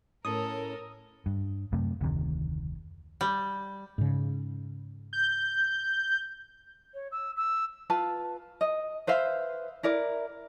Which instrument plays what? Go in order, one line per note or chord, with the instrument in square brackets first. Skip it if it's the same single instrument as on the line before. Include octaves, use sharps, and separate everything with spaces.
[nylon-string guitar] A2 C#4 [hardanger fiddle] A4 [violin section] A#4 [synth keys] D#6
[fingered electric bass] G2
F#2 C3 A3
F1 D2 C3 D#3
[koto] G3
[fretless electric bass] G#2 C#3
[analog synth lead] G6
[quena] C#5
E6
E6
[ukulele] F4 B4 A5
D#5
B4 C5 E5 F5
E4 A#4 D5